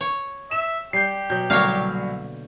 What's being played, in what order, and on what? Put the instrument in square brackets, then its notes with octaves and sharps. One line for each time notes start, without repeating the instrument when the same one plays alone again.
[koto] C#5
[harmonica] E5 [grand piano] E7
[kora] G3 [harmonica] G4 [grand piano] G6 C7
[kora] B2 F#3 F#5 [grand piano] G6
[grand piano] C2 F#3 F6 [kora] D3 [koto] A#3 C#5 F5